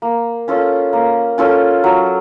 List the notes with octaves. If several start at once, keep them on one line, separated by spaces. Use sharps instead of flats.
A#3
C#4 F4 A4
A#3
C#4 F4 A4
F#3